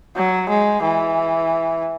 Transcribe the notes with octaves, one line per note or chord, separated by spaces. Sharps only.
F#3
G#3
E3